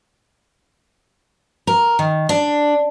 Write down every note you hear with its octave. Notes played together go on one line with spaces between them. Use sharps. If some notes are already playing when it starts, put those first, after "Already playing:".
A#4
D#3
D4